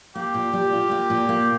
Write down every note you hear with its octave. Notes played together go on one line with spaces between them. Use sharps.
A#3 G4
A#2
G3
F4
A#3
A#2
A#3